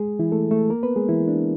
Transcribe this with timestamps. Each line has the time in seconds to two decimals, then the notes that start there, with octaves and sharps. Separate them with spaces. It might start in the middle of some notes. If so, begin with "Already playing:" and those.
Already playing: G#3 G#4
0.19 E3 E4
0.32 A3 A4
0.51 A3 A4
0.70 A#3 A#4
0.83 B3 B4
0.96 G#3 G#4
1.09 E3 E4
1.28 D4